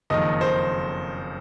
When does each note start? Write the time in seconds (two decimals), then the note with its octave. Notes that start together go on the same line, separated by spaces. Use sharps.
0.10 F#1 F2 D#3 D#5
0.41 C5